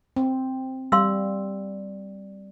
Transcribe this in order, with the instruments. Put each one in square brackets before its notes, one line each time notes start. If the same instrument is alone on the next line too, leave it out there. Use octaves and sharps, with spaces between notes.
[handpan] C4
[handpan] G3 [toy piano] F5 C6 E6